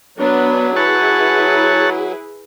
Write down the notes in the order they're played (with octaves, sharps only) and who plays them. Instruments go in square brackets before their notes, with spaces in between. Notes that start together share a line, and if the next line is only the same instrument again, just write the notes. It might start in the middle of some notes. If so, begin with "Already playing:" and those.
[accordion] F#3 [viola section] B3 D4 B4
[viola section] E4 G#4 B4 [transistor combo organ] C#5 F#5 A5